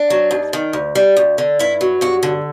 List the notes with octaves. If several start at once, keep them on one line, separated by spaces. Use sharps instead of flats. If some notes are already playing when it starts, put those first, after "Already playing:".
Already playing: D4
F#3
D#2
D#3
D2
G3
D2
D3
G2 E4
F#3
G2 F#4
D3